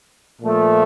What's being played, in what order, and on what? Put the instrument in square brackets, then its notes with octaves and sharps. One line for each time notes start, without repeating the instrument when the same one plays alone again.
[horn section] A#2 F3 A3